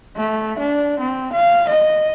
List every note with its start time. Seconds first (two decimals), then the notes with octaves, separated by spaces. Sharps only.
0.17 A3
0.59 D4
1.00 C4
1.33 F5
1.69 D#5